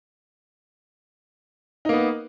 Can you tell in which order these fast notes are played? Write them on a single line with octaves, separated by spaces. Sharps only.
D#4 A#3 B3